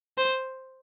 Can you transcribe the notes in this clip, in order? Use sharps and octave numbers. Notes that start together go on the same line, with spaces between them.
C5